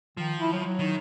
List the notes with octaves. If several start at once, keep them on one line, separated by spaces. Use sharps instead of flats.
D#3 F3
E4
F#3
F#3
D#3